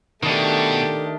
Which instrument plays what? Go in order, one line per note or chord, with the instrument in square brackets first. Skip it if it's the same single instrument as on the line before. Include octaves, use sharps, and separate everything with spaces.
[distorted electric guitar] B2 [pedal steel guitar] D#3 D4 [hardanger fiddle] A3 G4